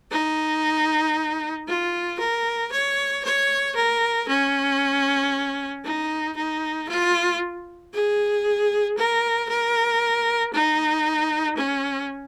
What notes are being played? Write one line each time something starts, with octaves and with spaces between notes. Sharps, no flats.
D#4
F4
A#4
C#5
C#5
A#4
C#4
D#4
D#4
F4
G#4
A#4
A#4
D#4
C#4